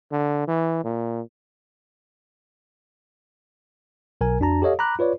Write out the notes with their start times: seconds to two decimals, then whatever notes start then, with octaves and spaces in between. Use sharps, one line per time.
0.11 D3
0.47 E3
0.84 A#2
4.21 B1 A#4 G#5
4.40 F2 D4 F#4 A5 A#5
4.62 G4 A4 C#5 D#5 F5
4.79 A#5 B5 D6 F#6
4.99 F4 B4 C#5 D5